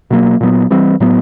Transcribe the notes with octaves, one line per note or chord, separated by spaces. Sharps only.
B2 F#3 A#3
A#2 F#3 B3
E3 G3 C4
A2 F#3 B3